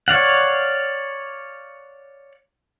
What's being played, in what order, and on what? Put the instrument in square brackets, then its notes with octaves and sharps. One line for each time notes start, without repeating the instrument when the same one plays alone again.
[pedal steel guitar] C#5 D5 F5 F#5